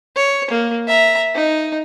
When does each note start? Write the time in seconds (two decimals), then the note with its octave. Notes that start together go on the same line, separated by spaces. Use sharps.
0.16 C#5
0.51 A#3
0.88 E5 A#5
1.35 D#4